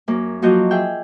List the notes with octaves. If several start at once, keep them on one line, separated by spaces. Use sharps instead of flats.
F#2 A#3
F3 F#3 A#3 F#4 D#5 G6
G#4 E5 G5